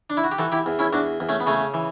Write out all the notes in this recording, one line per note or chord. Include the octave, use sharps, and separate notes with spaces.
D4
E4
F#4
G4
E3 F#4 A4
E4 G4
E2
C#4 E4
E2 D4 F#4
E2
A3 C#4
B3
C#3 A3 C#4
E3